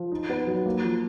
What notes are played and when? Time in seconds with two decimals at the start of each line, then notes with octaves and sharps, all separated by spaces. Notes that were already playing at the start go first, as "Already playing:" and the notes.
Already playing: F3
0.12 D#4
0.30 B3
0.47 F#3
0.66 A#3
0.84 F3